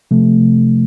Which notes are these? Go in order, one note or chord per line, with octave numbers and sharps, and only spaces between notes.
C3 F3 A3